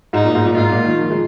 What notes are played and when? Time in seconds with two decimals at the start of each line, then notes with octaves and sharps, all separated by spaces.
0.13 G#2 D#4
0.25 A#2
0.35 G#2
0.45 A#2
0.57 G#2 F4
0.71 A#2
0.85 D#3
1.00 F3
1.10 G#3